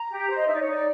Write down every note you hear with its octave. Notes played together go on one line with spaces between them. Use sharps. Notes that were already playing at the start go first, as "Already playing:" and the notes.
Already playing: A#5
G4
C5
D#5
D#4 E5
D5
C#5
D#4
D5